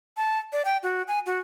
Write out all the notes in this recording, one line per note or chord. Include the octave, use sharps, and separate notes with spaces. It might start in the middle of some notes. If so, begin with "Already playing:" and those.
A5
D5
G5
F#4
G#5
F#4